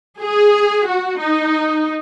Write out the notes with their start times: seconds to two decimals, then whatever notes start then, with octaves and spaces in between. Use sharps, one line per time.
0.20 G#4
0.87 F#4
1.20 D#4